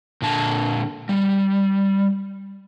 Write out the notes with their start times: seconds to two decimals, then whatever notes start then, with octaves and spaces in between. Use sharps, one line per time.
0.22 A#2 D3 A5
1.09 G3